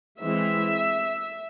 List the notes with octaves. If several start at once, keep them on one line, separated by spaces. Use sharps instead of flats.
E3 G#3 C4 E5